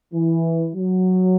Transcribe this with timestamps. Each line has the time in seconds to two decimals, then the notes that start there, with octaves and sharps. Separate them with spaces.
0.14 E3
0.75 F#3